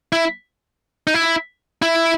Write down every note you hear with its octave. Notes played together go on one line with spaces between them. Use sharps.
E4
D#4
E4
E4